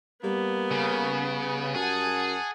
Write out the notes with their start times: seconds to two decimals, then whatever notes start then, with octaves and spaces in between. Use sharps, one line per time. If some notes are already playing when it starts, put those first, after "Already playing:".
0.23 G3 A#3 B3
0.71 C#3
1.75 F#2 G#4 F#5 A5